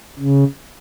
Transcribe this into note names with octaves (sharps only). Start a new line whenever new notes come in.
C#3